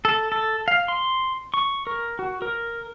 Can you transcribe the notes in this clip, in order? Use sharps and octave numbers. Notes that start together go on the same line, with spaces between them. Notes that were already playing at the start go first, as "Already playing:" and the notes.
A4
A4
F5
C6
C#6
A#4
F#4
A#4